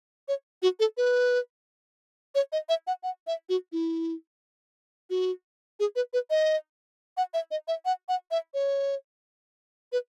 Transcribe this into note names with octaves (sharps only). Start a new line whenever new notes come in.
C#5
F#4
A4
B4
C#5
D#5
E5
F#5
F#5
E5
F#4
E4
F#4
G#4
B4
B4
D#5
F#5
E5
D#5
E5
F#5
F#5
E5
C#5
B4